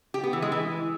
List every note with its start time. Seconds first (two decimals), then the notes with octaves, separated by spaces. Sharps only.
0.14 G4
0.24 B3
0.33 E3
0.42 G#3
0.52 E3